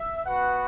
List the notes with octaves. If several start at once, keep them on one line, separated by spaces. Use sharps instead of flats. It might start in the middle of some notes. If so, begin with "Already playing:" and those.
Already playing: E5
B3 F#4 B4 F#5